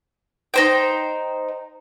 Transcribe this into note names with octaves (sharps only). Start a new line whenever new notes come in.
D#4 C5 G5